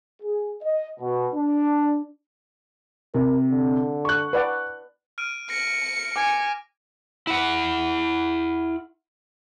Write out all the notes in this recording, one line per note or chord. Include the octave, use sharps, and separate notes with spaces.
G#4
D#5
B2
D4
C3 A#4
D3
C#6 F#6
B4 D5 F#5
F6 D7 D#7
A#6 C#7
G#5 D6 D7
E4 F#5